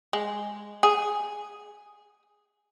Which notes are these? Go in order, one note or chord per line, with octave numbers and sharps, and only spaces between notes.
G#3
G#4